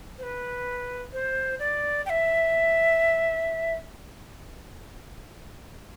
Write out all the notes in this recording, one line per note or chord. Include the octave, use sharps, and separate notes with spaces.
C5
B4
C5
D5
G5
E5